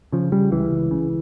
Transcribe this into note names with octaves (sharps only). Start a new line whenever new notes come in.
C#3 F3
C#3 G3
C#2 E3
C#2
C#3